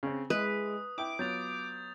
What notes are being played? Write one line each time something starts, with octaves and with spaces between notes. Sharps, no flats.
C#3 C4
G#3 E4 B4 D#6
E4 G5 D6
F#3 B3 F4 G6 A6 F7